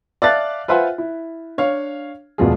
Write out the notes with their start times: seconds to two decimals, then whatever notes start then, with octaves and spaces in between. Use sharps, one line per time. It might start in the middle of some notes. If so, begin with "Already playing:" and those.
0.22 D5 E5 F5 A5 F#6 A6
0.68 F4 B4 C5 E5 F#5 G#5
0.98 E4
1.58 D4 C#5 F5
2.38 E1 D2 B2 F3 F4 G#4